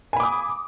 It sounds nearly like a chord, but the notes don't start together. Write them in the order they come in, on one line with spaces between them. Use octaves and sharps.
G#5 B5 D6 D#6